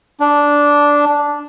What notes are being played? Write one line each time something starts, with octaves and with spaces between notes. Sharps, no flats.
D4